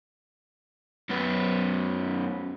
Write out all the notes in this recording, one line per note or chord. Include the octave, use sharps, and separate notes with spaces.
F#2 B3